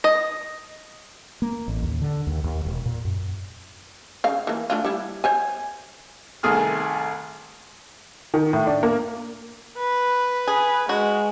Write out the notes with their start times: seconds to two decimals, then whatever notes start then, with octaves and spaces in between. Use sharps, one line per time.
0.04 D#5
1.42 A#3
1.68 A1
1.83 D#2
2.02 D3
2.27 D#2
2.44 D#2
2.65 E1
2.85 A#2
3.05 F#2
4.24 C#3 F5
4.47 E3 A#3
4.70 A3 D4 F4
4.85 G3 E4
5.24 C5 C#5 G#5
6.43 C2 D#3 A3 G#4 G#5 F6
8.34 D#3
8.53 A2
8.67 D4
8.83 A#3
9.78 B4
10.47 G#4
10.89 G#3 F#4